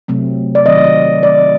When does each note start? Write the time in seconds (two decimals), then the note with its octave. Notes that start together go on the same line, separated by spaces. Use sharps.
0.08 C3 F#3 A3 C4
0.55 D5
0.66 D#3 F#3 C4 D#5
1.23 D#3 A3 C4 D5